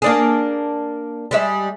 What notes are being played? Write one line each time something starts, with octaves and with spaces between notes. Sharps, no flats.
A#3 D4 G#4
G3 G#3 E5